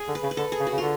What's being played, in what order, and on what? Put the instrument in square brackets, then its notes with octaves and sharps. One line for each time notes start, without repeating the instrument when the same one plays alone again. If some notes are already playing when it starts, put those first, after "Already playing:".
Already playing: [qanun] G#4
[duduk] D3
[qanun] B4
[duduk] C#3
[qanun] B4
[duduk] D3 [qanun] A4
[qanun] G#4
[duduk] C#3
[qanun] F#4
[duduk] C#3
[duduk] D3 [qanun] F4